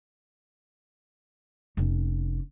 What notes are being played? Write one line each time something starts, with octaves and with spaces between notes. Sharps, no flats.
F1 C#4